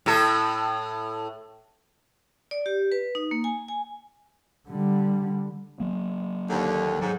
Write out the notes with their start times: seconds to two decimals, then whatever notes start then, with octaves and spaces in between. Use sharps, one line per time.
0.06 A2 A4
2.51 D5
2.66 G4
2.92 B4
3.15 D#4
3.31 A#3
3.44 G#5
3.68 G#5
4.69 D3 G3
5.80 F#3 A#3
6.50 D#2 D3
7.00 G#2 F#3